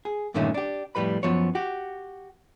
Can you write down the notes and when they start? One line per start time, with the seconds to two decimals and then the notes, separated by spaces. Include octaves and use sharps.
0.05 G#4
0.34 G2 A#2 D3 D#3 A3 C#4
0.54 D4 G4
0.95 F2 A2 G3 B4 B5
1.23 F#2 F3 B3 C#5
1.55 F#4 G4